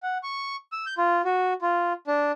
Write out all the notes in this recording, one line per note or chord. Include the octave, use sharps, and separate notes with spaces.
F#5
C#6
E6
G6
F4
F#4
F4
D4